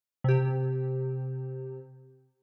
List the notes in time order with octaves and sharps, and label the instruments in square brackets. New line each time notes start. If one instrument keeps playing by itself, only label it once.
[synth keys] C3 G4